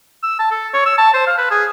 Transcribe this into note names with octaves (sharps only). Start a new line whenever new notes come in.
E6
A5
A4
C#5
E6
A5
C5
F5
B4
G#4